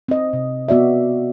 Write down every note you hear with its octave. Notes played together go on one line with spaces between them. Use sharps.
C4 D#5
C3
B3 F#4 D5 E5